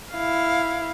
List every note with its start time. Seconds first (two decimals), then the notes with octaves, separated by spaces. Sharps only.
0.13 E4 F5